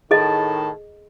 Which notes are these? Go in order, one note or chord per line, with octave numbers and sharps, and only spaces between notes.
A2 D#3 G#4 A4 D#5 A5